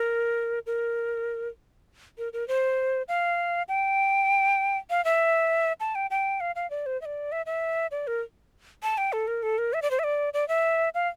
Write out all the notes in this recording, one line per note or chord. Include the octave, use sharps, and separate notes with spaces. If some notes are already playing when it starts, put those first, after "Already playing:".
Already playing: A#4
A#4
A#4
A#4
C5
F5
G5
F5
E5
A5
G5
G5
F5
F5
D5
C5
E5
D5
E5
E5
D5
A#4
A5
G5
A4
A#4
A4
A#4
E5
D5
C5
E5
D5
D5
E5
F5